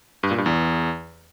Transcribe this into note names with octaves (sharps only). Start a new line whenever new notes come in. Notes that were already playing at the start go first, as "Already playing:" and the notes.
G2
A#2
G2
E2